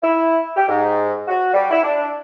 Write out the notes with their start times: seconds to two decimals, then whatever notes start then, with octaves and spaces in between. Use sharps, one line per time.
0.03 E4
0.56 G4
0.69 G#2
1.28 F#4
1.54 G3
1.71 E4
1.83 D4